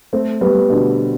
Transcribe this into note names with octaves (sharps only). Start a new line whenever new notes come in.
A3 C4
G3 B3
B2 D3